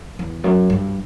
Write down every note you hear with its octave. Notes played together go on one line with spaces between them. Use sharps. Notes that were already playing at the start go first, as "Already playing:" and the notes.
E2
F#2
G2